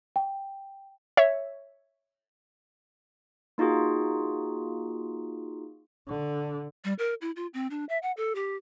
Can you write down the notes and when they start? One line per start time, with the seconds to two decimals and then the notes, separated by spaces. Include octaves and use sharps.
0.16 G5
1.17 C#5 E5
3.58 A#3 D#4 F4 F#4 G#4
6.08 D3
6.85 G3
6.99 A#4
7.21 E4
7.36 F4
7.54 C4
7.71 D4
7.89 E5
8.03 F#5
8.17 A4
8.35 G4